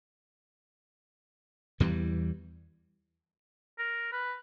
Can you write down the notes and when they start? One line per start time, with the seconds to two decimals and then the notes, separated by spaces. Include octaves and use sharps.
1.80 E2 E3 G3
3.79 A#4
4.12 B4